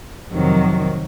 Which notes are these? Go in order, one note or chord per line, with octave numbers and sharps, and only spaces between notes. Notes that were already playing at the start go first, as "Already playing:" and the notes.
F2 C3 D#3 F#3